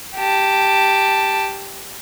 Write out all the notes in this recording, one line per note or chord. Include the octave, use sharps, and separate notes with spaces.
G4 A5